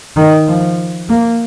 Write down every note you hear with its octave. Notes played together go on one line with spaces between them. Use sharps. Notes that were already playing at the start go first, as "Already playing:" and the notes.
D#3
F3
A#3